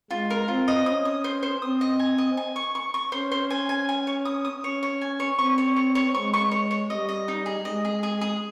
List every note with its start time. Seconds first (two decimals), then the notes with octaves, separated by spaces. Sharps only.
0.11 G#3 F4
0.30 A#4
0.48 C4 F4
0.68 D#5
0.86 C#4 D#6
1.05 D#6
1.24 C5
1.43 C5
1.62 C4 D#6
1.81 D#5
1.99 G#5
2.18 D#5
2.37 G#5
2.56 C#6
2.75 C#6
2.94 C#6
3.12 C#4 C5
3.31 C5
3.50 G#5
3.69 G#5
3.89 G#5
4.07 C#5
4.25 D#6
4.45 D#6
4.63 C#4 C#5
4.83 C#5
5.01 G#5
5.20 C#5
5.39 C4 C#6
5.58 C#5
5.76 C#5
5.95 C#5
6.15 G#3 C#6
6.34 C#6
6.52 C#5
6.71 C#5
6.89 G3 D#5
7.09 D#5
7.28 D#4
7.46 G#4
7.65 G#3 D#5
7.85 G#4
8.03 G#4
8.21 G#4